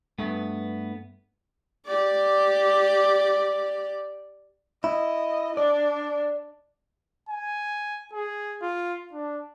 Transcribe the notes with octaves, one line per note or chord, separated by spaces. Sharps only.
G2 A3 B3
G4 D5
E4 D#5
D4 D5
G#5
G#4
F4
D4